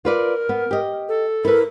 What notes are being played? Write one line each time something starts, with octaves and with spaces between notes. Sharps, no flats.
F4 A#4 B4 D5
B3
G4 D#5
A4
E4 A#4 B4